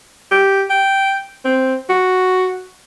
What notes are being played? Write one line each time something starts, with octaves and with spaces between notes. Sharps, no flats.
G4
G5
C4
F#4